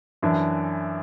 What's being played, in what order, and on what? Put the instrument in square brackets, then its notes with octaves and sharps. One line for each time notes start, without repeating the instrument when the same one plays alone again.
[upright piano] F#2 E3 D4